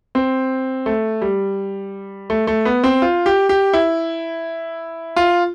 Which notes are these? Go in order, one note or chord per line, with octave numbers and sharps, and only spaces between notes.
C4
A3
G3
A3
A3
B3
C4
F4
G4
G4
E4
F4